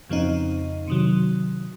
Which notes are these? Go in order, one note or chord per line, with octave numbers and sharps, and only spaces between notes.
F2 C#3 F3 C4 D#4
C3 D#3 F#3